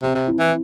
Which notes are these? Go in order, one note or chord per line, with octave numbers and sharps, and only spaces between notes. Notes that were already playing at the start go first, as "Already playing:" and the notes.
C3 C4
C3
E4
E3